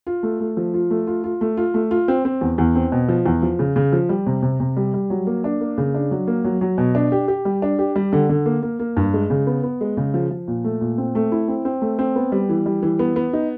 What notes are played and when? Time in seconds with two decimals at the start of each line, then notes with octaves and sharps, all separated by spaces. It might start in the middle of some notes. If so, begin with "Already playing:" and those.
0.07 F4
0.23 A3
0.40 A3
0.57 F3
0.74 F4
0.90 A3
1.07 F4
1.24 F4
1.41 A3
1.57 F4
1.74 A3
1.91 F4
2.08 C4
2.25 C4
2.41 E2
2.58 E2
2.75 C4
2.92 B2
3.08 F3
3.26 E2
3.42 F3
3.59 C#3
3.76 C#3
3.93 F3
4.09 G3
4.26 C3
4.43 C3
4.60 C3
4.77 G3
4.94 G3
5.10 F#3
5.27 A#3
5.44 D4
5.61 A#3
5.78 C#3
5.95 D4
6.11 F#3
6.27 A#3
6.44 F#3
6.61 F#3
6.78 B2
6.95 D4
7.12 G4
7.28 G4
7.45 G3
7.62 D4
7.79 G4
7.96 G3
8.13 D3
8.29 D3
8.46 A#3
8.63 A#3
8.79 A#3
8.97 G2
9.14 G#3
9.30 C#3
9.47 B3
9.63 B3
9.81 G#3
9.97 C#3
10.14 F3
10.31 F3
10.48 A#2
10.64 A3
10.81 A#2
10.98 C4
11.15 A3
11.32 E4
11.48 C4
11.65 C4
11.82 A3
11.99 C4
12.16 B3
12.32 G3
12.49 E3
12.66 G3
12.83 E3
12.99 B3
13.16 B3
13.33 D#4